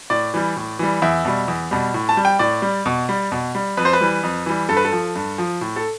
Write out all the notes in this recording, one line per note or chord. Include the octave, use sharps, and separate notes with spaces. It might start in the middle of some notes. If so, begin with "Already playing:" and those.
A2 D5
E3 G3
A2
E3 G3
E2 E5
B2 G3
E2
B2 G3
A2
A5
G3
G5
A2 D5
G3
B2
G3
B2
G3
F2 B4
C5
B4
E3 G3
F2
E3 G3
G2 A4
B4
A4
F3
G2
F3
A2
A4